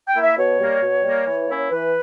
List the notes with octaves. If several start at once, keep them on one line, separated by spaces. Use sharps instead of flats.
G5
A#3 E4
E5
B2 C#5
G3 A#3
B2
G3 A#3
E3
A#3 C#4 E4
E3 B4